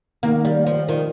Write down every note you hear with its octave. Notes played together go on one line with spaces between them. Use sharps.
D#3 A#3
G3
F3
D#3 F3